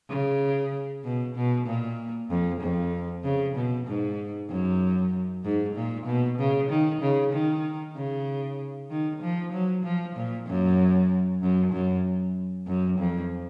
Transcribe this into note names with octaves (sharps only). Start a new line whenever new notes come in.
C#3
B2
B2
A#2
F2
F2
C#3
B2
G#2
F#2
G#2
A#2
B2
C#3
D#3
C#3
D#3
C#3
D#3
F3
F#3
F3
A#2
F#2
F#2
F#2
F#2
F2